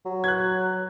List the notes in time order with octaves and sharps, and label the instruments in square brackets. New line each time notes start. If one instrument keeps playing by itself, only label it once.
[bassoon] F#3
[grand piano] F#6 G#6